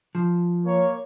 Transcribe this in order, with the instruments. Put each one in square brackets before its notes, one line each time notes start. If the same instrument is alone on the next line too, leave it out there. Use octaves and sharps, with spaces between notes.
[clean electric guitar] F3
[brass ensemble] A#3 C#5